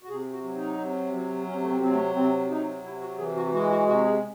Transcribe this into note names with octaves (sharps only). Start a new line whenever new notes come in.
F#4
C3 G#4
F#4
F#3
D#4
C3
F#3
C3 C#4
A3
C4
F#3 C4
A3
C3 C4
F#3 D#4
C3 E4
F#4
E3 G#4
F#4
G#3 F#4
F#4
C3 F#4
G#4